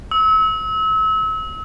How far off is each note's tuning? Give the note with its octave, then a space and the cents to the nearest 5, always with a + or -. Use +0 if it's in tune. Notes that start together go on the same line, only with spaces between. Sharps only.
E6 -35